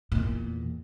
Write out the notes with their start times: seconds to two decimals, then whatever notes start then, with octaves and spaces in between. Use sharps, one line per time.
0.12 E2 A#2